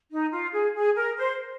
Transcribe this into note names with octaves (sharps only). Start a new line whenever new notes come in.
D#4
F4
G#4
G#4
A#4
C5